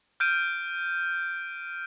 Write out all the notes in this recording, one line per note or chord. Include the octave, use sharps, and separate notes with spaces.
F6 G6 D7 D#7